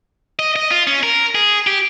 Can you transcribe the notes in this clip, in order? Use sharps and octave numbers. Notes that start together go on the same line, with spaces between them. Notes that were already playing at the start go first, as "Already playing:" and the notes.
D#5
D#5
F4
C#4
A#4
G#4
G4